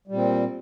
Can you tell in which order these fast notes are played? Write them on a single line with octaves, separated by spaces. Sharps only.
G3 A#2 C4